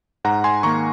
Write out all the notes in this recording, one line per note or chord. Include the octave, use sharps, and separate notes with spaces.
G#2 F#5 A#5
G#5 C6
D#3 A#3 A#5 C#6